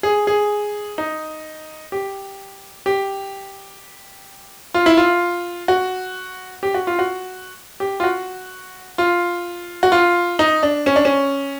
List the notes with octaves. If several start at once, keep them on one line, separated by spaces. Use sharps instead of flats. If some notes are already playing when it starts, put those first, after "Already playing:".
G#4
G#4
D#4
G4
G4
F4
E4
F4
F#4
G4
F#4
F4
F#4
G4
F4
F#4
F4
F#4
F4
D#4
D4
C#4
D4
C#4